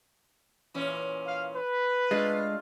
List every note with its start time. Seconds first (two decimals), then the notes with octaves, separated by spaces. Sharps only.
0.74 A#2 E3 C#4
1.27 F5
1.56 B4
2.11 G#3 A3 D4 F4